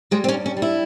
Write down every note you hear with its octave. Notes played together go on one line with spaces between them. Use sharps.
G3 G#3
C4
C#4
G2
C#4
G3
E4